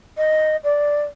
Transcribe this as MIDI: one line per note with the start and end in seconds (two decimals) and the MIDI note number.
0.17 0.56 75
0.64 1.02 74